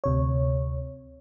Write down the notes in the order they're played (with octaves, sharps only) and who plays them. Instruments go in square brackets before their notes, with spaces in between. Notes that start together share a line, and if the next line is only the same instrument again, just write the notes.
[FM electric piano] D2 C3 C#5